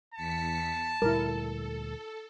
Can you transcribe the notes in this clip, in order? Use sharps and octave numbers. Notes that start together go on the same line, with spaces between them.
E2 A5 B6 C#7
D2 A#2 G3 E4 A4 A#4